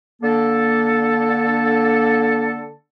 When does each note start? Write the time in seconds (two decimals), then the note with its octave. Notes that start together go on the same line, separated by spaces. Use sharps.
0.22 D3 A#3 A4